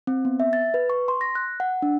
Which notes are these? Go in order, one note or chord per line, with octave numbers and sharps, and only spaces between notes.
C4
B3
E5
A6
B4
C#6
C6
A#6
F#6
F#5
D4